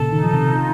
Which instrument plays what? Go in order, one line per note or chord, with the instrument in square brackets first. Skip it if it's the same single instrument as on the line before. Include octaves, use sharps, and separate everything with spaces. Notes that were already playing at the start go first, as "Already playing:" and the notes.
Already playing: [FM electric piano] A#2 C#3 [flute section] A4
[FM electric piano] D#3 [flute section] D#4
[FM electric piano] F3
C3 D#3
[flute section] F4